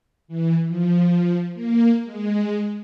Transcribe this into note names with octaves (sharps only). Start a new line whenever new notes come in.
E3
F3
A#3
G#3